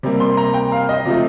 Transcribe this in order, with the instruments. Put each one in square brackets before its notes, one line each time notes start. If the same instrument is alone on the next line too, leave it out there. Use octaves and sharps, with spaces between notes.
[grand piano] C3 G3 A#3
C6
A#5
G5
F5
D#5
C3 F3 A3